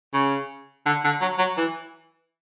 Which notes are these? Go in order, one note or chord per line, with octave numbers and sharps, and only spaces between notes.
C#3
D3
D3
F#3
F#3
E3